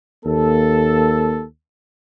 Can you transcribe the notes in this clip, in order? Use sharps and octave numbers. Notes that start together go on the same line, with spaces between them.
D#2 A#3 A4